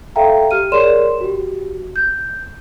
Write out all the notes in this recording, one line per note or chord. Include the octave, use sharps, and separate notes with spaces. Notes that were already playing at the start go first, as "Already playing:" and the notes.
A4 E5 F5 G5 A#5
G4 F6 D#7
G#4 A#4 C#5 D5 C6 E7
F#4 G4
G6